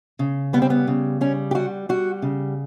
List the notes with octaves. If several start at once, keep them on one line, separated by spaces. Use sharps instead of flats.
C#3
G3 B3
C4
B3
C#3
G3 C#4
G4
G3 F#4
G3 F#4
C#3